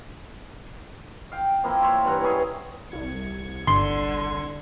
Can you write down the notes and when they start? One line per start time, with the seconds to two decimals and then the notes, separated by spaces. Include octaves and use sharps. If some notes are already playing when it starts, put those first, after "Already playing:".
1.32 F5 G5
1.64 F3 A#3 C4 E4
1.82 C5 C#5 E5
2.05 G2 E3 F#5 A#5
2.23 E3 C#4 E4 G#4
2.91 C2 G#6 C#7
3.67 G1 D3 C6